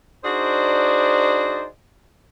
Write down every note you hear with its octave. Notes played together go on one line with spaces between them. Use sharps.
D4 D#4 F#4 G#4 C5 D5